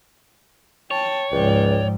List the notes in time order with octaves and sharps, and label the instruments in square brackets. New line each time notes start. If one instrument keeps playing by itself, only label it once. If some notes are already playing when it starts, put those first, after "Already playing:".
[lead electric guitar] C#5 [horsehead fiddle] G5 A5
[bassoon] C#2 [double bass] G#2 F3 [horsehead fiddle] D5 G5